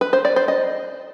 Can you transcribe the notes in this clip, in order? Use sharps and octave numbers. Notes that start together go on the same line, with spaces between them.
B4
C5
D5
C5
D#5